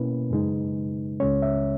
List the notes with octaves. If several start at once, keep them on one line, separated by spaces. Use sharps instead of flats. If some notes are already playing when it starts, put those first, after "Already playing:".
Already playing: B2 A#3 C#4 E4 B4
F#2 C#3 G#3 D#4
C#2 C#3 G#3 C#4 C#5
E5